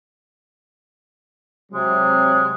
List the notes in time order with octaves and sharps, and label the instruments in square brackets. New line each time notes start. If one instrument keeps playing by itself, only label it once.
[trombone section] C3 F#3 [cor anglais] G#3